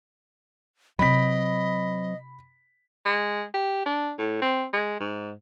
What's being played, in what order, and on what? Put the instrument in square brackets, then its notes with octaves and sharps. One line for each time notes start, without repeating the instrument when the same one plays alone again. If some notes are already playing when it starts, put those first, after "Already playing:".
[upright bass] C3 E4 [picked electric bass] F#3 C4 [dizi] D#5 [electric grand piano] B5 B6
[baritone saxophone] G#3
G4
D4
A2
C4
G#3
G#2